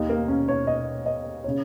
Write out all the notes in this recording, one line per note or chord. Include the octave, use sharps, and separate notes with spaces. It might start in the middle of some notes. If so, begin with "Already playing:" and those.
Already playing: D#2 D#3 D#4
A#3
C#4
C#5
D#5
D#5
C#3 C#5